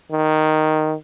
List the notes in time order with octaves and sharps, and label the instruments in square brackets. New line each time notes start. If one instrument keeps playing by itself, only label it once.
[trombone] D#3